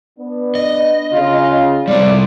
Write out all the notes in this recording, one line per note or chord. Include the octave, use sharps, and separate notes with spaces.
B3 D4
D#5
C#3 F4
F2 G#2 C3 G3 C4 D5